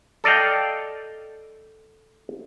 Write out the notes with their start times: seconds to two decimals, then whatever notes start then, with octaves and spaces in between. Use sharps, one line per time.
0.24 A4 D5 D#5 F5 G5